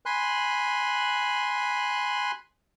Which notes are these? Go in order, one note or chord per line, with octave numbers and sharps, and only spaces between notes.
G#5 B5 C6 F#6